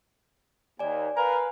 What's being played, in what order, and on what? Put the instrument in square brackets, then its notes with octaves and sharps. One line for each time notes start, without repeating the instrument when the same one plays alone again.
[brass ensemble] D#2 [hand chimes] D5 G#5
[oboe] A#4 [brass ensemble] B4 F5 [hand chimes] G#5